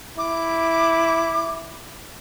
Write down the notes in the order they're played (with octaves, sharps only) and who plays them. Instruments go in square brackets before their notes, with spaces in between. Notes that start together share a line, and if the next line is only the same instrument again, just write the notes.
[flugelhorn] E4 [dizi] D6